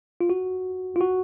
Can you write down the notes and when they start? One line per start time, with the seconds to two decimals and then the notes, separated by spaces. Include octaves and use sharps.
0.21 F4
0.30 F#4
0.96 F4
1.01 F#4